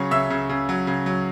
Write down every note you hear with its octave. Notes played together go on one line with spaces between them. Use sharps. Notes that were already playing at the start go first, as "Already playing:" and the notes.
Already playing: C#3 F#3 C#5 C#6
C#3 E5 E6
C#3
C#3
F#3
C#3
F#3